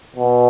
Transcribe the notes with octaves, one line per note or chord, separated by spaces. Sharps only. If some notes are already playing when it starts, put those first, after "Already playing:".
B2